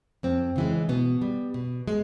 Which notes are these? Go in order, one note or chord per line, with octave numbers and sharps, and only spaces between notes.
F2 C4
C#3 E3 G#3
B2 B3
G3
B2
G#3